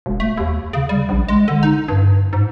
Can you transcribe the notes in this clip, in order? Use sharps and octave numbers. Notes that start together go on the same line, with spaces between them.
E1
A3
D#2
C#3
G3
A#1
G#3
D3
D#4
G2
G#2